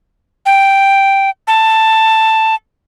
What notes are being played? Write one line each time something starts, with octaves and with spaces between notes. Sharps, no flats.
G5
A5